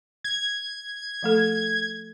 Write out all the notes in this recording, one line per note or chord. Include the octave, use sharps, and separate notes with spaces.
G#6
F3 A3 A4